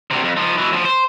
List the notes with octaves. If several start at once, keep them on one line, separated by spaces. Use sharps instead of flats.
D2 C3
F2
F3 D#4
B2 E3
D2 F3
C5